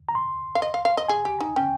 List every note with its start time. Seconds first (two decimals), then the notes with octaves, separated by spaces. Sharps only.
0.09 A#5
0.15 C6
0.55 F5
0.62 D#5
0.74 F5
0.85 F5
0.97 D#5
1.08 G#4 G#5
1.25 G4
1.40 D#4
1.56 C#4 G5